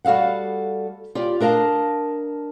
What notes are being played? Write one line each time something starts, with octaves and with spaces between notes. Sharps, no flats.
G3 F#4 A4 F5 F#5
F4 G4 D5
D4 A#4 D#5 F5 A5